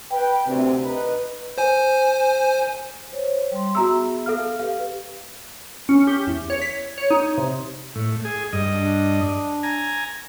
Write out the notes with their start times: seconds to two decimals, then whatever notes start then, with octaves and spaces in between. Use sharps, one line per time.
0.11 B4 G5
0.47 D2 C3
0.84 D#4 B4
1.58 C5 G#5
3.12 C5 C#5
3.52 G3 C6
3.75 B3 F#4 G#4 E5 A#5 E6
4.26 A4 F5 F6
4.59 G4 B4 F5
5.89 C#4
6.07 G4
6.27 E2
6.50 C#5
6.62 B6
6.98 C#5
7.11 D#4
7.38 C3
7.95 A2
8.25 G#4
8.53 G2 D#5
8.74 D4
9.63 G#5 A#5